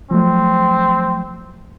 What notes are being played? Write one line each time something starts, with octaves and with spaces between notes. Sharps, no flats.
F3 F#3 A3 C4